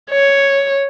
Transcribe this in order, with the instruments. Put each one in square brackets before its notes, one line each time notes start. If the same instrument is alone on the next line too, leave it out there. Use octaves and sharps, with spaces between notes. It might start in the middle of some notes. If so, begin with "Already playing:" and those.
[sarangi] C#5